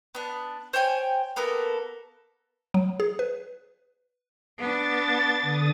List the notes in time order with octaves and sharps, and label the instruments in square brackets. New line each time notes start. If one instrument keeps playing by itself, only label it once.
[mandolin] B3 D4
C5 C#5 G5 G#5
A#3 B3 A4 A#4
[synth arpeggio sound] F#3
G#4
B4
[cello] B3 D4 [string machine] A6
[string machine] D3 D#6